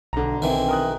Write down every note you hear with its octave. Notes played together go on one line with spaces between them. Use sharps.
B1 D3 A#5
D#3 E3 C4
A#4 D#6 F#6